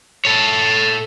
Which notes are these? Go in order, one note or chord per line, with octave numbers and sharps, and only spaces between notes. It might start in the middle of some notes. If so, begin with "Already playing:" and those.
A4 C#5